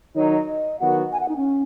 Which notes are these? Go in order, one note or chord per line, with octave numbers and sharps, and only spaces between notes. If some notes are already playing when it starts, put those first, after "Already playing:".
D#3 F#3 D#4 C#5
D#5
D#3 F#3 B3 F#4 F#5
G#5
F#5
D#4
C#4